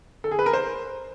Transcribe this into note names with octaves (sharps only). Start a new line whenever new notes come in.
A4
G#4
B4
A#4
C5